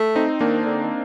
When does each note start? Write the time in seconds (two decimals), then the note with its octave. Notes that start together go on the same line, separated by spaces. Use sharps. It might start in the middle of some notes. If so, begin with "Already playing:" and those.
Already playing: A3
0.15 C4 D#4
0.41 D#3 A#3 D4
0.65 D3
0.84 D#3